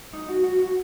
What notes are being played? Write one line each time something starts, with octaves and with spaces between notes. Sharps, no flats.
D#4
F#4
F#4
F#4